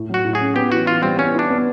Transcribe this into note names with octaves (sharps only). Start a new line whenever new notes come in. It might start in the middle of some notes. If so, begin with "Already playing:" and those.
Already playing: A2
F#3 F#4
A2
G#4
C#4
B3 G4
E3 F#4
E3 F4
G3 C4
B3 C#4
D4 E4
B3